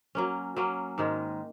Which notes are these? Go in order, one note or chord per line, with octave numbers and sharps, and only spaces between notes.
F#3 A#3 C#4
F#3 A#3 C#4
G#2 D#3 G#3